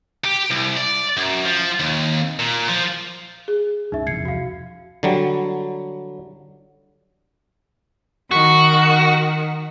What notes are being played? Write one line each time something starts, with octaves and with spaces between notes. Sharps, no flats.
G4
C2
D5
F#2
F3
D#2
A#2
F3
G#4
C#2 G2 C#3 D#4 E5
E1 C2 F2 G#6 C7 C#7
F#4 F5
D3 F#3 G3
D#3 F#4